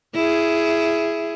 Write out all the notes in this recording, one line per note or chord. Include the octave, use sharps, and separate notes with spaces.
E4 G#4